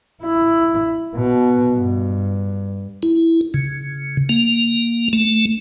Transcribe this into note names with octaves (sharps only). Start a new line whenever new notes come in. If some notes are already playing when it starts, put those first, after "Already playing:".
E4
B2
G2
E4
C#3
A#3
A3